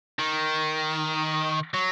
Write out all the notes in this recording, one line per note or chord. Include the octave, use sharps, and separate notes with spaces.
D#3
F#3